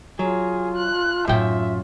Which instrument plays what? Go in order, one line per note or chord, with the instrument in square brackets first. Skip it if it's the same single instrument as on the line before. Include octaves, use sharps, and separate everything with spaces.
[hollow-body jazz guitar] F#3 [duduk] F4 [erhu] G#4
[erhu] F#6
[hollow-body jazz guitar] F#2 G5 [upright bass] A2 D#4 [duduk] F4 [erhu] E5